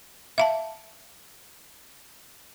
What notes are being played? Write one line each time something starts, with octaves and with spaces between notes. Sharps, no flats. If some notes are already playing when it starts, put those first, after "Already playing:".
E5 F5 A5